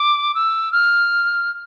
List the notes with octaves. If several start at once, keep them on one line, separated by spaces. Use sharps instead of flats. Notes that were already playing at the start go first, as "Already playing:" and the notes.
Already playing: D6
E6
F6